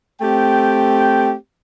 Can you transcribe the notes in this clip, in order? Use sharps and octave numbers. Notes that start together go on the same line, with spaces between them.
A3 C4 G4 G5